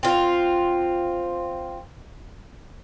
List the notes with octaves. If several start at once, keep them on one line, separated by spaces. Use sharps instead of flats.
C4 F4